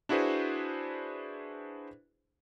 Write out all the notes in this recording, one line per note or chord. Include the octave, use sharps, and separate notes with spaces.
D4 E4 F#4 G#4 B4 C5